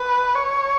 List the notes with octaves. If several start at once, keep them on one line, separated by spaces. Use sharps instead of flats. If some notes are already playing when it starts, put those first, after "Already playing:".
Already playing: B4
C#5